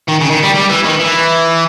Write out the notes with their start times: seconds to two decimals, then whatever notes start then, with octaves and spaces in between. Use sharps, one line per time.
0.09 D#3
0.21 C#3
0.31 D#3
0.43 G3
0.55 G3
0.70 E3
0.84 D#3
1.00 E3